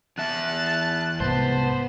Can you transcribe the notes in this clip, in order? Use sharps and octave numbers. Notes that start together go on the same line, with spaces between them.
E2 E5 A5 F#6
C2 G#2 B3 C5 A5